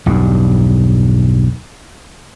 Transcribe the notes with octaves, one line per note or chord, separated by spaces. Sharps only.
B1 E2 G2